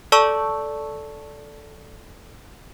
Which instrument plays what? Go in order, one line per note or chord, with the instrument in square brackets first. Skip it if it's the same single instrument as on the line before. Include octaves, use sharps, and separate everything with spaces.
[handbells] A4 D5 A5 C#6 E6